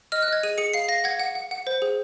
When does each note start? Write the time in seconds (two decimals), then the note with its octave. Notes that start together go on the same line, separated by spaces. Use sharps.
0.12 D#5 F6
0.22 F#6
0.28 D#5 G#6
0.43 G#4 D#7
0.58 G#4 C#7
0.73 F5 C7
0.88 F5 A#6
1.04 F#5 G#6
1.19 F#5
1.35 F#5
1.51 F#5
1.67 C5
1.82 G#4